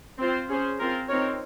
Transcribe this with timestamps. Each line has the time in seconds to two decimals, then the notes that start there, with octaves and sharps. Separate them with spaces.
0.19 C4 F4 C5
0.50 C#4 G#4 C5
0.79 C4 F4 A#4
1.09 C4 D#4 A#4 C#5